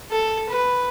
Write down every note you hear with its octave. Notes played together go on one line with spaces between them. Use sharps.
A4
B4